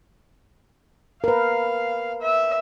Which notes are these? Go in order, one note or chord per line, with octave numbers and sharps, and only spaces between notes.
A#4 B4 F5
E5